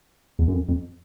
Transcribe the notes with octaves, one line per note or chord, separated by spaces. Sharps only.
E2
F#2
F2
F2